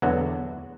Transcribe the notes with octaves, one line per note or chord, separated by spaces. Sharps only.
E2 D3 F#3 B3 F#4